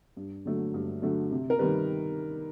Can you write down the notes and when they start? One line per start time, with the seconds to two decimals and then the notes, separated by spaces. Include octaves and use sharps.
0.17 G2
0.45 D3 F#3 A3
0.74 G2
1.02 D3 F#3 A3
1.31 C3
1.50 A#4
1.59 D#3 G3 B4